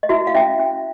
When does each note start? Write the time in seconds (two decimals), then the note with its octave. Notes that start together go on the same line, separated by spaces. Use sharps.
0.03 D#5
0.09 E4 F#4 E5
0.27 F5
0.35 C#4 E4 E5
0.59 C#4